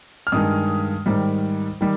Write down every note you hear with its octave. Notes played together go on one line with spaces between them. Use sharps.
F6
G2 D#3 G#3 D#6
G#2 D#3 G3
D#3 G3